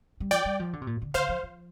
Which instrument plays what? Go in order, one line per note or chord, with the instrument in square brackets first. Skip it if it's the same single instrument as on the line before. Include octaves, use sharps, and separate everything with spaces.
[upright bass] G3
[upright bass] F3 [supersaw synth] D5 G5
[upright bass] G3
F3
D3
C3
A#2
D3
[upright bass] D3 [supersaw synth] C5 F5
[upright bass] F3
F3